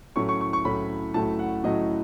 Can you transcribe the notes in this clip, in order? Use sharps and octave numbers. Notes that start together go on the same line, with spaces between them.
A2 F#3 A3 C#4 C#6
C#6
C#6
C#6
A2 F#3 A3 C#4 B5
A2 F#3 A3 C#4 A5
F#5
A2 F#3 A3 C#4 D#5